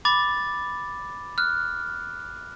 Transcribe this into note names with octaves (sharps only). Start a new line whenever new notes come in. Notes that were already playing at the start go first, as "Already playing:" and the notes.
B5 D6 A6
F6 F#6